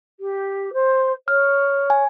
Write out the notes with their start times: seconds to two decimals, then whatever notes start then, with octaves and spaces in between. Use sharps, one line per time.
0.20 G4
0.73 C5
1.28 C#5 F6
1.90 G#5